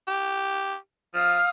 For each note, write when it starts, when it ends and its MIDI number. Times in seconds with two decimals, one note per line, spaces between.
0.08 0.76 67
1.14 1.39 53
1.14 1.50 77
1.14 1.50 87
1.14 1.50 89